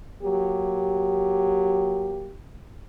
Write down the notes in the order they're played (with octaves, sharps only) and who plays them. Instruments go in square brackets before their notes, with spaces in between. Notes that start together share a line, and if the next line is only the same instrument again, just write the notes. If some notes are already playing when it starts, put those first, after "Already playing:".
[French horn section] F#3 A#3 G4